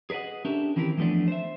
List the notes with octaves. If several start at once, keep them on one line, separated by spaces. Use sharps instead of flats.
G#4 B4 D5 D#5 F#5
C#4 D4 G4 A4 A#4 E5
D#3 E3 C4 F#4 G4 A#4
E3 F3 A3 B3 D4
C5 E5